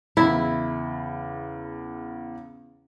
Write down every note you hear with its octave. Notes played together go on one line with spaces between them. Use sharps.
E2 C#3 E4